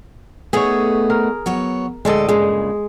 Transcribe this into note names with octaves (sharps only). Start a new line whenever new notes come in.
A3 B3 D#4 G#4 C#5
A#4
F#3 B3 C#5
D2 A2 G#3 A4 D5 D#5
G2 A#2 C#3 G#3